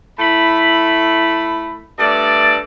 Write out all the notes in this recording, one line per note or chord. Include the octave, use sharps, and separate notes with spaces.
A3 E4 B5
G2 A3 A4 D5